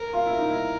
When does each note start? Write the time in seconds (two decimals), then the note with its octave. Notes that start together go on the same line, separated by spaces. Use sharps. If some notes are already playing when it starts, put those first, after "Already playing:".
Already playing: A#4
0.13 F4
0.26 E4
0.38 D#4
0.50 E4